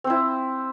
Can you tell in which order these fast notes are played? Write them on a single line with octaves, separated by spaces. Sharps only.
C4 C5 E4